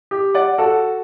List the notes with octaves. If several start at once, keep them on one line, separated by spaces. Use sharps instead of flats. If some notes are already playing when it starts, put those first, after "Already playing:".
G4
D5 F#5
F#4 A4